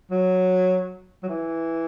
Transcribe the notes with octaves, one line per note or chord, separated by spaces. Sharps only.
F#3
F#3
E3